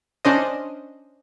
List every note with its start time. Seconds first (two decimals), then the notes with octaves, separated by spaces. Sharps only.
0.25 C#4 D4 C5 D#5